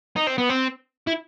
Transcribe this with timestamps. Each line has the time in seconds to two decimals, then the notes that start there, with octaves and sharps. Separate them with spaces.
0.16 D#4
0.27 C4
0.38 B3
0.49 C4
1.07 E4